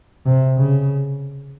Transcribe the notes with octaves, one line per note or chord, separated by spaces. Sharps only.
C3
C#3